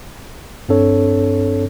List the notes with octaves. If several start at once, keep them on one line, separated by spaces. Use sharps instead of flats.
G2 C4 D4 A4 C#5